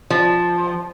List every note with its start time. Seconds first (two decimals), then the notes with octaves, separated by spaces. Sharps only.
0.10 F3